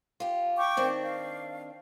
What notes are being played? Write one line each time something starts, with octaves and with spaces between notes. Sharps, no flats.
F4 G4
G5 C#6 D6
D#3 C4 D4
F5